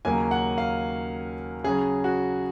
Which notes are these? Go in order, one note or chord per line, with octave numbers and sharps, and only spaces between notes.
D#2 C#3 F#3 A#3 C#4 G#5
F#5
F5
C#3 F#3 C#4 G#4
F#4